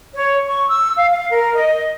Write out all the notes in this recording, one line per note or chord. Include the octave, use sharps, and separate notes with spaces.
C#5
C#6
E6
F5
F5
A#4
D#5